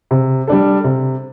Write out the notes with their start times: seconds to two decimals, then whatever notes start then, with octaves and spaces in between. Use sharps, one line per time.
0.11 C3
0.47 G3 D4 A4
0.84 C3